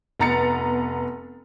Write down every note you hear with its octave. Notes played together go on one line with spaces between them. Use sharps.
F1 B3 A#5 A6 C#7